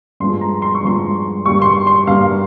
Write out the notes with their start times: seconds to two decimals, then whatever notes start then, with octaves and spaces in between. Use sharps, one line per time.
0.20 G2 F3 G#3 C6
0.41 A#5
0.62 C6
0.75 C#6
0.83 G2 F3 G#3 C6
1.45 G2 G3 A#3 C#6
1.62 C6
1.66 C#6
1.87 C6
2.07 G2 G3 A#3 F5